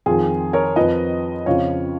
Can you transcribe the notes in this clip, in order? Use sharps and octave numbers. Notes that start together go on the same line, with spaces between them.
F2 D#3 F4 G#4
A#4 C#5
F2 F3 B4 D#5
F2 C#3 F3 C#5 F5